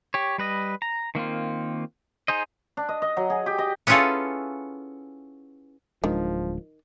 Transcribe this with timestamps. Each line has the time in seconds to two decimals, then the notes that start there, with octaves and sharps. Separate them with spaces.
0.14 G4 C#5
0.38 G3 B4 D#5
0.82 A#5
1.15 D#3 A#3 C4 F4
2.28 D#4 G#4 C5 D#5
2.77 D4
2.89 D#5
3.02 D#5
3.17 F#3
3.30 G#4
3.46 G4
3.58 D#5
3.87 B3 C#4 E4 F4 G#4 A4
6.04 D1 D#3 F3 G#3 D4